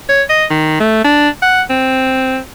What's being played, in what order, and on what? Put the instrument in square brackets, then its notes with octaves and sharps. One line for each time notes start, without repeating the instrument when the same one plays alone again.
[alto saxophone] C#5
D#5
D#3
A3
D4
F#5
C4